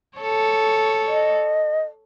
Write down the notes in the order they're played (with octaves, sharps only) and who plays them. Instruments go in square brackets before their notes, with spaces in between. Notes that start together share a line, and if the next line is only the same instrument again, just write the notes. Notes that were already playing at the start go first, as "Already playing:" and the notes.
[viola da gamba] A4 C#5
[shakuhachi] D#5